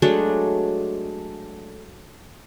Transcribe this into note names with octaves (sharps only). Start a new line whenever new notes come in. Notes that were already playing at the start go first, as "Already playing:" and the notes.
F#3 G#3 A3 D4